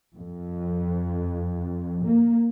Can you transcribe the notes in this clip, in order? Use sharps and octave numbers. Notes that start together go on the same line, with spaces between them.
F2
A#3